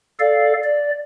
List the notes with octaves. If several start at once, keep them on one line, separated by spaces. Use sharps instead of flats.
A4 D5 F5
D5